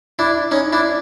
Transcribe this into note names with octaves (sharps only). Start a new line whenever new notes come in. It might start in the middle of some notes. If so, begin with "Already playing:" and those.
D4 E4
C#4 D#4
D4 E4